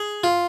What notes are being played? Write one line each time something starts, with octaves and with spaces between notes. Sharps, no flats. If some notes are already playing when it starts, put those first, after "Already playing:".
Already playing: G#4
F4